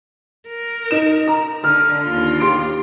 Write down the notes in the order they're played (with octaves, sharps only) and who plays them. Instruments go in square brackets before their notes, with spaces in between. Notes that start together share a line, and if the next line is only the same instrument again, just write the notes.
[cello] A#4
[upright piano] D#4 E7
A#5
[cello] D3 [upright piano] F6
[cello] D#2 F4
[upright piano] G4 C6 D7